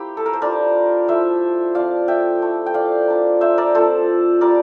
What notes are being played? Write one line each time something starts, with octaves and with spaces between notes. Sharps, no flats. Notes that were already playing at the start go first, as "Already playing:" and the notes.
Already playing: A#3 E4 G4 C5
A4
A#4
C5
G3 D4 F4 A#4 D5
F3 A3 E4 C5 E5
F3 C4 F4 D5 F5
E5 G5
F3 A3 E4
G5
D5 F5
A#3 D4 F4
C5 E5
A#4 D5
F3 C4 F4 A4 C5
G3 D4 F4 A#4 D5